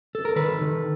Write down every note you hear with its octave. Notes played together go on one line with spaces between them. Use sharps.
A4
A#4
D#3 A4 B4
D#3